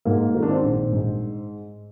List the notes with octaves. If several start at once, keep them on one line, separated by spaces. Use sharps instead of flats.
G#2 A#3
D#3
D4
C4
A#1
G#2